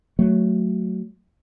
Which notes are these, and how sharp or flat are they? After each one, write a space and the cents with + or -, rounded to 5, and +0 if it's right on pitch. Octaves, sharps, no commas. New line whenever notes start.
F#3 +0 A3 +0